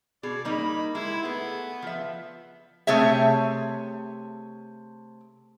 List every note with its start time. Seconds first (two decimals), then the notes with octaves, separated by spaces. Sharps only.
0.23 B2 G#4 D5
0.45 G3 A#3 D#4 B5
0.95 G#3 E4
1.23 A3 B3 G#4
1.82 F3 E5
2.87 C3 A3 G#4 C#5 E5